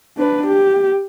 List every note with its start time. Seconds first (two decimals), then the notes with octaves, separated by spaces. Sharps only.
0.18 D4 B4
0.47 G4